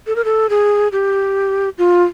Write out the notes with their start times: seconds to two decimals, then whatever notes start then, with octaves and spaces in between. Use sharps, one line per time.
0.07 A4
0.16 A#4
0.25 A4
0.50 G#4
0.92 G4
1.78 F4